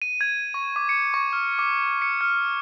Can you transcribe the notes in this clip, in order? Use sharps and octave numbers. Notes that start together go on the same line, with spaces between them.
D#7
G#6
C#6
D6
C#7
C#6
F6
D6
C#7
F6